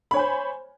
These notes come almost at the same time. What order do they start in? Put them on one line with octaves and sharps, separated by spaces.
B5 C#5 G#5 C5